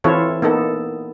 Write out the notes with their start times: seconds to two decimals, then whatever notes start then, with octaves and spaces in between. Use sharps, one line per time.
0.04 E3 C4 E4 F4 A4 C#5
0.42 A#3 B3 D#4 A4